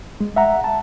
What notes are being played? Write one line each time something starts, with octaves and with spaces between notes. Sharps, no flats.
G#3
E5 F#5 A#5
A5